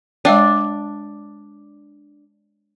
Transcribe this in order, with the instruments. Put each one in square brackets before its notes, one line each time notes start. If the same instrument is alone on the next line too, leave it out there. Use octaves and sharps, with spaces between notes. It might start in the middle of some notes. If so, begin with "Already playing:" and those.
[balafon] G#3 F5 G5 [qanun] D4